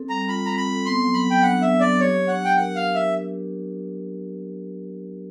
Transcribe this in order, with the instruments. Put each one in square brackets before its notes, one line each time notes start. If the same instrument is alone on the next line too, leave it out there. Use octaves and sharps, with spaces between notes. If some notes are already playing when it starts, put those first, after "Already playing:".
Already playing: [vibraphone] C4 A4
[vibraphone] G3 [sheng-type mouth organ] A#5
[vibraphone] F4 [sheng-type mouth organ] B5
[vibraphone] C4 [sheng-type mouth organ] A#5
[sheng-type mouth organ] B5
[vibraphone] A4
[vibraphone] B3 [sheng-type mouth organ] C6
[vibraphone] F#3
[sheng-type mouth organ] B5
[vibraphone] F#3
[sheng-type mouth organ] G5
[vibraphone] D4 [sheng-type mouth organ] F#5
[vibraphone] B3 [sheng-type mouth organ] E5
[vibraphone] F#3 [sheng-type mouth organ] D5
[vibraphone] G4 [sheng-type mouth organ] C#5
[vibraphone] D4
[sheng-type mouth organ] F#5
[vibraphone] D4
[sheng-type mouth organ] G5
[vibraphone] A#4 [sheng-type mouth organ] F#5
[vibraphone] G4 [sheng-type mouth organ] F5
[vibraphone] D4 [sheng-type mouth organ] E5